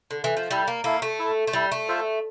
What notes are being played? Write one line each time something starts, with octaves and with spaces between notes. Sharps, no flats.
D3
E3
F3
G3 E4 A4 E5
A#3
A#3 E4 A4 E5
A3
E4 A4 E5
A3
G3 E4 A4 E5
A3
F4 A4 C5 E5